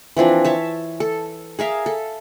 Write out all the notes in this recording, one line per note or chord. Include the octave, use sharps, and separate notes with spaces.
E3 F3 C4 D4
C#5 E5 A5
A4
G#4 A#4 E5 F5
A4